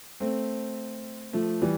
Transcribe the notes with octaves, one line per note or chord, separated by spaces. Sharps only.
A3 C4
F3 A3
E3 G3